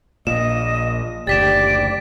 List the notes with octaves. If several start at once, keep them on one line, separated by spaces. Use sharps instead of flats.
A#1 A#2 D#5 E7
F#1 D2 G4 D5 A6 B6 E7